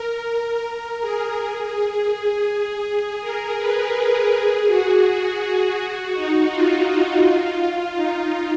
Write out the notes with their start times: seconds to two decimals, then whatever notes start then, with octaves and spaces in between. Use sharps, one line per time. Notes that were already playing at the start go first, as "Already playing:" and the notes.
Already playing: A#4
0.64 A#4
1.01 G#4
1.38 G#4
2.84 G#4
3.21 A#4
3.58 B4
4.30 G#4
4.67 F#4
5.03 G#4
5.40 F#4
5.77 F#4
6.14 D#4
6.50 F4
7.97 D#4